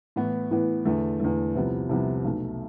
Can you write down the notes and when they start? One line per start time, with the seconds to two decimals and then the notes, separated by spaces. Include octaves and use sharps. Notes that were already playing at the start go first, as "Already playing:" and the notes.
0.16 A2 E3 B3
0.51 A2 E3 B3
0.85 E2 D3 A3
1.20 E2 D3 A3
1.55 C2 C3 F3 B3
1.89 C2 C3 F3 B3
2.24 B1 B2 A3